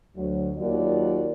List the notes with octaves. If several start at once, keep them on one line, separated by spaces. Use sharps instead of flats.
D2 F#3
D#2 F#3 A#3 F4 D5